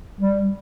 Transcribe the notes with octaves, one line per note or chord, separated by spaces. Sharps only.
G3